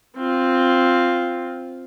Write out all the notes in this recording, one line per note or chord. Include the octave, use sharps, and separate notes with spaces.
C4 F4